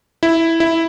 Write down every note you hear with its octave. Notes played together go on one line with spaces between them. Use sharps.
E4
E4